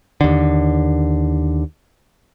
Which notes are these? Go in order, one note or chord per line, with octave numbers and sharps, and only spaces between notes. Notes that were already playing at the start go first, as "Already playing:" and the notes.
D#2 D3